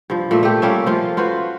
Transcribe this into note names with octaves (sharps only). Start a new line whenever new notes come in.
G2 F3
A#2 A3 E5
A3 G4
G3 A#3 C#4 E5
F3 A3 F4
F4 F#4 B4 C5